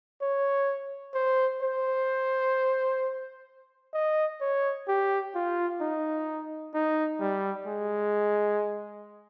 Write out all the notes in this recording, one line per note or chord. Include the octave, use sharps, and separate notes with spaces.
C#5
C5
C5
D#5
C#5
G4
F4
D#4
D#4
G3
G#3